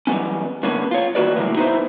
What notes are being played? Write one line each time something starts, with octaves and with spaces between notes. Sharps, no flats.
E3 F#3 G3 A3 B3 C#4
G2 D3 A#3 B3 C#4
F4 C#5
E2 D#3 A#3 F#4 B4 D5
A2 C#3 E3 F#3 G3 A#3
B3 D#4 E4 B4 C5